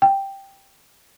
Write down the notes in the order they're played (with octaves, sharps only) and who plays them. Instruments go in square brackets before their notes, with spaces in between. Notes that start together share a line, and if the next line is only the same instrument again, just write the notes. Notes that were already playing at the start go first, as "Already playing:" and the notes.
[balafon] G5